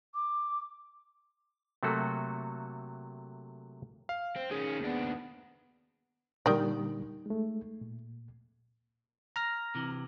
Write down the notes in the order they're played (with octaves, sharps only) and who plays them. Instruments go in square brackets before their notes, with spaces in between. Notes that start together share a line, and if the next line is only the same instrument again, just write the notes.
[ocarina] D6
[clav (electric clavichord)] C3 F#3 A3 A#3 F#4 A4
[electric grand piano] F5
[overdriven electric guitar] C4
[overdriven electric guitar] D#3 C#4 [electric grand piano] G#4
[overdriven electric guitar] D#2 D4 [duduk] B3
[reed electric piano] A#2 D3 G3 [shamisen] D#3 D5
[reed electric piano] G#3 A3
A#2
[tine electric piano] A#5 F6 A#6
[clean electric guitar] C3 E3